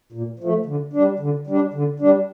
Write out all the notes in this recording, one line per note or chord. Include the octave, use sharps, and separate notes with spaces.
A#2
F3 A3
D3
G3 D4
D3
G3 D4
D3
G3 D4